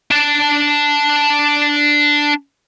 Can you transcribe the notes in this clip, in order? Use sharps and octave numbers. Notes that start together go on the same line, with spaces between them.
D4 A5